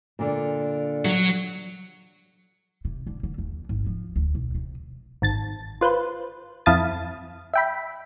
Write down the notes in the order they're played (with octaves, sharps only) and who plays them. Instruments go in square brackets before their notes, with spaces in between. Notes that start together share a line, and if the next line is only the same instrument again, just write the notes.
[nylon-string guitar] A#2 D3
[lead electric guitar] F#3
[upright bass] C3
D3
D3
D#2
G#1
F3
D2
B1
C3
[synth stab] G#1 A5 A6
F4 B4 C5
F2 E4 F5 A5 D#6 A6
E5 G5 B5